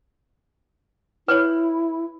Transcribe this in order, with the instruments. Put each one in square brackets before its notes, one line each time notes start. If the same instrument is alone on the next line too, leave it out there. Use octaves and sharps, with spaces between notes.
[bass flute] E4 [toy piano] B4 C#5